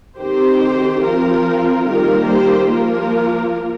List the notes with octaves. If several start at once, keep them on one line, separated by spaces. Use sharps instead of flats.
D#3 C4 G4 C5
F3 C4 F4 A#4
D#3 G3 A#3 F4 A#4
G4 C5
F3 A#3 F4 A#4